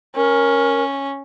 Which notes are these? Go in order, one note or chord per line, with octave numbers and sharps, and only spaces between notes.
C#4 A#4